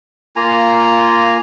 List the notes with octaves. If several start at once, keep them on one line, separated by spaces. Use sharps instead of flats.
A#3 F4 G#5 A#5